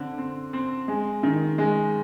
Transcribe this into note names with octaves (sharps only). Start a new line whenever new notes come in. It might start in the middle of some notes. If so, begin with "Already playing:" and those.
Already playing: D3 C4
C4
C4
G#3
D#3
G#3